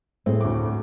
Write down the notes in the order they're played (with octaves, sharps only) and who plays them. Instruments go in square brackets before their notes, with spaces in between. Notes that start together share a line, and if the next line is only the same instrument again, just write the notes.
[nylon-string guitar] A2 A3 [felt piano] C4 G#4
[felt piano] D2 D6